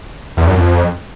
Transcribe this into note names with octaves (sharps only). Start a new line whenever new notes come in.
E2
F#2
F2